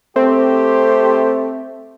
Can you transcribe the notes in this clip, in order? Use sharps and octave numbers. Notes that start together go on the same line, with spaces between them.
A3 C4 G4 C5